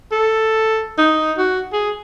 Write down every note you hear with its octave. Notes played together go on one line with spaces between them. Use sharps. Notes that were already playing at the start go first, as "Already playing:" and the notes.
A4
D#4
F#4
G#4